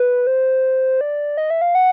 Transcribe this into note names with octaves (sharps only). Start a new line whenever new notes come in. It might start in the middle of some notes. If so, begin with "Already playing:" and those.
Already playing: B4
C5
D5
D#5
E5
F5
F#5